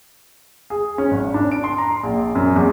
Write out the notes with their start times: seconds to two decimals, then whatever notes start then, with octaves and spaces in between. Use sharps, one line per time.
0.70 G#4
0.98 C#4
1.11 G#1
1.34 D4
1.52 D7
1.64 C6
1.78 A#5
2.03 A#1
2.35 F#2
2.56 E2